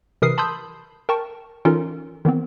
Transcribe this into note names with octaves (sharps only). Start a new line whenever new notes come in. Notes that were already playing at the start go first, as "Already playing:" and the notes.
C3 E3 A#4 B4 D#6 C7
A5 B5 C6 D#6 E6 G6
A#4 G5 A5 C#6
E3 C#4 D#4 F4 A4 A#4
D#3 E3 B3 C4